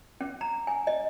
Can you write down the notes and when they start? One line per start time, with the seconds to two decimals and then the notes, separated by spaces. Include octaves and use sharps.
0.21 C#4
0.41 A#5
0.67 G#5
0.87 D#5